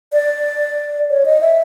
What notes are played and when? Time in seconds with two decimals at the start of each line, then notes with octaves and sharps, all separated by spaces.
0.13 D5
1.10 C#5
1.25 D#5
1.41 E5